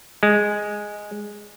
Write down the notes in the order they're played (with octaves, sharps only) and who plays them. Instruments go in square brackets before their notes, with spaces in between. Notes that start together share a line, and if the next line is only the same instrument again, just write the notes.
[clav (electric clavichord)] G#3